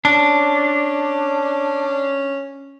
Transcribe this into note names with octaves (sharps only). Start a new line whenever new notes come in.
C#4 D4